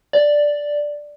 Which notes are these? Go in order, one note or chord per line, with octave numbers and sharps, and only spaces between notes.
D5